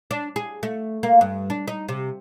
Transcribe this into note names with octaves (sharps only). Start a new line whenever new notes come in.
D4
G#4
A3
A#3
G2
D4
D#4
C3